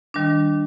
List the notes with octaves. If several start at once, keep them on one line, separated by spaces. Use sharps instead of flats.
D#3 G3 D4